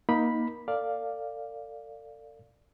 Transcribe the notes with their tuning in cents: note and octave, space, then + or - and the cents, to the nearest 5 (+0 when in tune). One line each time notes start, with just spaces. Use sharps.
A#3 +20 D#4 +15 B5 -5
A4 +40 D5 +0 F5 +0